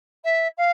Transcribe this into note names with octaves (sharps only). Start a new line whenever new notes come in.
E5
F5